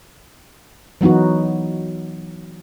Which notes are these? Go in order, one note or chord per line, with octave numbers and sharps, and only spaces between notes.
E3 F#3 B3 D#4 F#4